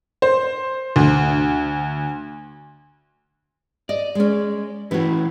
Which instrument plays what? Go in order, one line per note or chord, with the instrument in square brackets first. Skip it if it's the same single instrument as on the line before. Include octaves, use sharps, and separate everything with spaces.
[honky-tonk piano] C5
D2
[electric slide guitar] D5 [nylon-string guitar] D#5
[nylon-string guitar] G#3 C#4
[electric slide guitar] E3 C#4 E4 [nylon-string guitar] F#4 B4